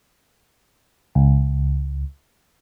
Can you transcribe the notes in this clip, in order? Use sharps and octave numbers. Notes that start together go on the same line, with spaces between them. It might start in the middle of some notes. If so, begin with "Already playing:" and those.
C#2